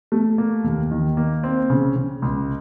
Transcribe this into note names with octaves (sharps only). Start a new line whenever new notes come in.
A3
A#3
D#2
D#3
A#3
C4
C#3
C#3
C#2